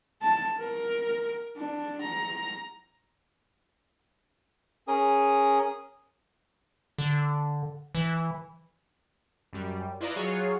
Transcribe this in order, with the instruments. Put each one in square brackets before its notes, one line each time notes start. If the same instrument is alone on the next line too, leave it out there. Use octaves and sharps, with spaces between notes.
[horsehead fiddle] A5
A#4
D4
A#5
[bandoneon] C#4 G#4 A#4 D#6
[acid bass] D3
E3
[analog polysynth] F#2 G3
E4 F4 B4 D5 D#5 A#5
F#3 F4 F#4 G#4 C#5